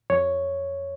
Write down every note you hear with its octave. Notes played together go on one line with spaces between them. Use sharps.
F2 C#5